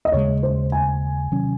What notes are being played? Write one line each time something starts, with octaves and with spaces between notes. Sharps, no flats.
D#5
D#2 C#3 G#3 C#5
C5
G#5
C3 D#3 F#3 C#4